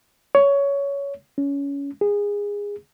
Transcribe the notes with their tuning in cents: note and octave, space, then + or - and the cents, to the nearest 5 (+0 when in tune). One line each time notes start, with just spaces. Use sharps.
C#5 +15
C#4 +20
G#4 -20